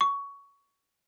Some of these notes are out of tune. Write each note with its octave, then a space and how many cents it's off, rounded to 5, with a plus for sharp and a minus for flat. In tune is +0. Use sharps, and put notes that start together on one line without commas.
C#6 +15